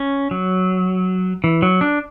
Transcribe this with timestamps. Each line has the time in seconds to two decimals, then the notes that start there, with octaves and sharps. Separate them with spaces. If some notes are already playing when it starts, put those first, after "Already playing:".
Already playing: C#4
0.31 F#3
1.44 E3
1.62 F#3
1.81 D4